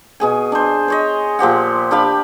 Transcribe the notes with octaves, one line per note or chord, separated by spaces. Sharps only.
B2 G#4 G#5
D4 C5
C5 C#5 D#5
A#2 F3 G4 F#5
D4 G4 F5 B5